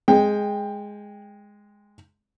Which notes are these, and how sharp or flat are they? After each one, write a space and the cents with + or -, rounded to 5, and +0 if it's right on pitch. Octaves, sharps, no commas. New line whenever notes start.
G#3 +0 G5 +20